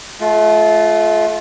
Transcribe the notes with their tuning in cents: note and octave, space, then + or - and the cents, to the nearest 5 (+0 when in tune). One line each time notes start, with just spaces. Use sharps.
A3 -35 F4 +0